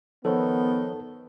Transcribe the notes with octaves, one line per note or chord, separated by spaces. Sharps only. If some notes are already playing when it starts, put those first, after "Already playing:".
D#3 F3 B3 A4 C5 C#5